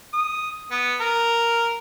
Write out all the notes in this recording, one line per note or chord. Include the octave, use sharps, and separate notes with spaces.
D#6
B3
A#4